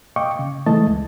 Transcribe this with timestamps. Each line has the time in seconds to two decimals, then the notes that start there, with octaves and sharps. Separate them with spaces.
0.16 D#5 F5 G5 C#6 D6
0.39 C#3
0.66 E3 G#3 A3 D#5 A5
0.87 C#2